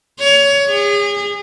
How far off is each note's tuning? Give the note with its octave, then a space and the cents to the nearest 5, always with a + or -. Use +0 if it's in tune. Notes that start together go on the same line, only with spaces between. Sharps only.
C#5 +20
G#4 -35